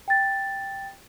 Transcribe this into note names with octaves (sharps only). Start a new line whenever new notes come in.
G5 A6